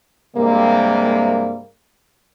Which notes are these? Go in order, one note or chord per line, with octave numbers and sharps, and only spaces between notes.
G2 C3 G3 G#3 A#3